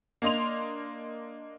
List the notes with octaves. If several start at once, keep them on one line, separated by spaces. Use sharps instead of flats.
A#3 D4 D#5 C6 F7